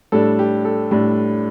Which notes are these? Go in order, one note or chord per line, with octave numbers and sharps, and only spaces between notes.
A2 G3 D4 A4
G4
A4
A2 G3 D4